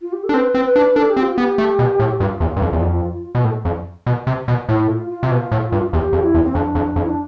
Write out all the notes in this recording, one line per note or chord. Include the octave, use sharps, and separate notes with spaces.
F4
G4
A4
D4
C4 B4
C4
B4
D4
D4 A4
G4
C4
F4
B3 G4
A3
B2
A2
G2 F4
E2
G2
F2
E2
F2
B2
A2
F2
B2
C3
B2
A2 E4
E4
F4
F4
C3
B2 F4
A2
G2
E2 G4
F2
E4
E2
C4
F2 D4
F2
F2
E4
D4